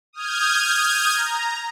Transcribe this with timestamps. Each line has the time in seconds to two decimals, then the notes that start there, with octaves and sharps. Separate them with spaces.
0.13 D#6 F6 G6 G#6
1.14 A#5